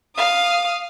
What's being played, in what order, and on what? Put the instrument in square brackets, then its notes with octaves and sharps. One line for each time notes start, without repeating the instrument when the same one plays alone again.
[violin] F5 D#6